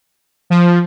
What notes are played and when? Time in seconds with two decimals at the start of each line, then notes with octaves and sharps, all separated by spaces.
0.50 F3